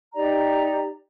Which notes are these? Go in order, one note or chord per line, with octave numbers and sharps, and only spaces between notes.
D#4 G4 D5 A#5